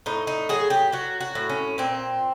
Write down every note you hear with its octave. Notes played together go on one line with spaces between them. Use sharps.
A2 D#4
D#4
F#3 G#4
G4
F#3 F#4
F#4
A2
C#4
A#2 C4